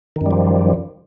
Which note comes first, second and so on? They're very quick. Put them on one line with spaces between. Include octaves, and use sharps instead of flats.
D#3 F#2 G3 F3